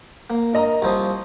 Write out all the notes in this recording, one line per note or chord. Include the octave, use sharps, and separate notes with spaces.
A#3
A#4 D#5 A#5
C2 F3 D#6